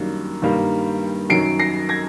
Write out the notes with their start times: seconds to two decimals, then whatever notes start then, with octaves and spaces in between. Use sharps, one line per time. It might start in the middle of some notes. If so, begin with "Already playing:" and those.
Already playing: F#2 D#3 G3 A#3 D4
0.42 G2 D#3 G3 A#3
1.30 F#2 D#3 F#3 C7 D7
1.59 A#6 C7
1.89 G#6 A#6